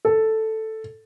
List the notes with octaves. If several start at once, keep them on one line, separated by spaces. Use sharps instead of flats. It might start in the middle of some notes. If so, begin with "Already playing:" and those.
A4